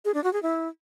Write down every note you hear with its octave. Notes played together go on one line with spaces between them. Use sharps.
G#4
D4
F#4
G#4
E4